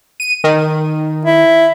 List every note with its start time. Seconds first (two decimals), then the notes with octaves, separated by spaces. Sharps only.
0.20 D#7
0.44 D#3
1.25 E4